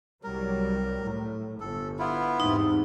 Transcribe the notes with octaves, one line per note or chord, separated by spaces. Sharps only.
C2 F#3 G3 A#4
A2
G1 A4
B3 E4 F4
E2 G#2 C3 D#4